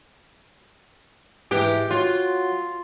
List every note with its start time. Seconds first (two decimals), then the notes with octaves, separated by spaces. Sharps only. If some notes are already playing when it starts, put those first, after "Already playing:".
1.51 G#2 E3 G4
1.91 F#3 F4